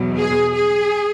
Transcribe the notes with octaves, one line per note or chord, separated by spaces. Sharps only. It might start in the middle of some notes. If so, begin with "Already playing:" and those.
Already playing: E2 B2 F#3
G#4
G#4